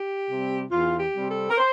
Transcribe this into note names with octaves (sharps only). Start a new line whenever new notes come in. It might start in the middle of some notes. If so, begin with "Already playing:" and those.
Already playing: G4
C3 G3 C4
E2 F4
G4
C3 G3 C4
A4
A#4
C5